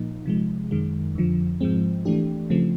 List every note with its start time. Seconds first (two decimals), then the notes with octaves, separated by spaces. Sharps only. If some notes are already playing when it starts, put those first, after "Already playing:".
Already playing: A#2 F3 A#3 D#4
0.26 C3 F3 G#3
0.71 F#2 D#3 G#3
1.15 F2 D3 F3
1.61 G#2 F3 G#3 C4
2.05 E3 A3 D4 G4
2.50 C#3 F3 A3 C4